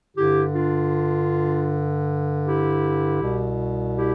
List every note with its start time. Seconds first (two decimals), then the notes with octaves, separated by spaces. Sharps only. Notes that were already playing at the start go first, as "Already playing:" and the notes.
0.15 G2 D3 E4 G4
0.54 D4 F4
2.44 E4 G4
3.20 C2 B2
3.96 E4 G4